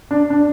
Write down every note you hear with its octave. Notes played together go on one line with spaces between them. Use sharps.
D4
D4